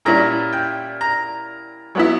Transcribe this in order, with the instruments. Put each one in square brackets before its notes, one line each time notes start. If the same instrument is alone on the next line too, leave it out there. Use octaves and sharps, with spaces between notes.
[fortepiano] A#2 G3 C#4 E4 A#5
G5
A#5
F#3 B3 E4